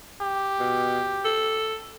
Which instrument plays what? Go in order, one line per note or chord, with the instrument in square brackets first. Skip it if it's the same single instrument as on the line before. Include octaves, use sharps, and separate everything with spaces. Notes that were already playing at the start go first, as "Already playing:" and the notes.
[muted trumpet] G4
[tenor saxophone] B2
A4